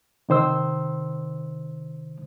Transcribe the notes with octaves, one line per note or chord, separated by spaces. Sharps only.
C3 D#3 C5 E6